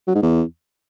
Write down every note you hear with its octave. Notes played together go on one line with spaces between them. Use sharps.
F#3
G#2
E2